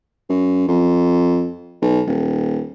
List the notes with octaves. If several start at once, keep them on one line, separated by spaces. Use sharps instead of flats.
F#2
F2
B1
D#1